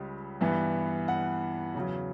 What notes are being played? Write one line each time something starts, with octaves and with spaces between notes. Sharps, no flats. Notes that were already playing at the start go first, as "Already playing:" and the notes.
Already playing: C#2 C#3 G3
G2 E3 B3
F#5
E2 C#3 F#3